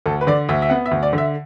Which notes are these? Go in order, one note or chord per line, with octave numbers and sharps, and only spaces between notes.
D2 A4
B4
D3 D5
D2 E5
E5
B3 F#5
E5
D2
D5
D3
E5